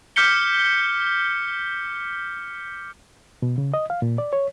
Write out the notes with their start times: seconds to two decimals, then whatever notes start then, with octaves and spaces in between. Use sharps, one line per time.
0.16 D6 F6 G6 B6 C#7 G7
3.42 B2
3.58 C#3
3.74 D#5
3.90 F5
4.02 A#2
4.18 D5
4.33 C#5